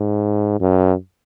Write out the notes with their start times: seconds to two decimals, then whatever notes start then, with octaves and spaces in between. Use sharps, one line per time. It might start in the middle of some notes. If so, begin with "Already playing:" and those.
Already playing: G#2
0.61 F#2